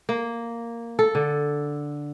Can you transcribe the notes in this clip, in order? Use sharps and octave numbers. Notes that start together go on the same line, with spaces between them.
A#3
A4
D3